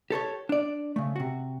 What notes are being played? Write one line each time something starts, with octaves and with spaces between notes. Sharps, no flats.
G4 A4 C5 C#5
D4 D5
C#3 A3
C3 F#4